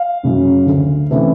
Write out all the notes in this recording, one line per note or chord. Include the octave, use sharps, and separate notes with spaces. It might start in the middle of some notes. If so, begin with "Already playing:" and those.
Already playing: F5
F#2 C#3 F#3
D2
C#3 E3 A3 C4